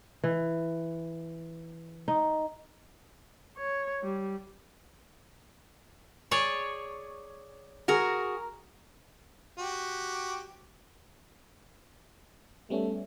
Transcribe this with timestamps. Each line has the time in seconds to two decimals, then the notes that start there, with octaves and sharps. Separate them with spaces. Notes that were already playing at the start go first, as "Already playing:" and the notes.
0.24 E3
2.08 D#4
3.58 C#5
4.03 G3
6.31 G#4 C#5 D5
7.88 F#4 G#4 A#4 A#5
9.58 F#4 G4
12.70 G3 A3 B3 C#4